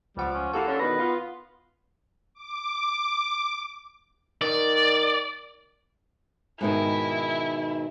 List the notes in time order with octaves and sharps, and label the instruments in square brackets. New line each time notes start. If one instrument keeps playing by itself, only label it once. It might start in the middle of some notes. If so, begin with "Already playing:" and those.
[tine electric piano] C#2 F#5 D6 [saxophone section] F3 [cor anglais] G3
[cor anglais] C#4
[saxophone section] A#3 [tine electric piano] E4 G4 F#5 [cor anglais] A4
[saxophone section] D3 C#4
[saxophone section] B2 D#3 [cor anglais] B4 [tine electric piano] A#6
[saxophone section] B3 F4
[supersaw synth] D6
[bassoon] D#3 [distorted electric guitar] D5
[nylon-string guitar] G#2 B2 D#3 [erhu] E4